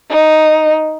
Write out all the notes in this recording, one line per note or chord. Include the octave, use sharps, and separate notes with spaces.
D#4